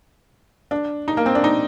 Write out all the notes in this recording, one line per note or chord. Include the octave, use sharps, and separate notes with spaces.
D4
D#4
A#3
C4
D4
D#4